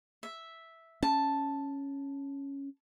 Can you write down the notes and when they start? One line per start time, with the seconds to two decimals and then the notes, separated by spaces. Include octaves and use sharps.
0.23 E5
1.03 C#4 A5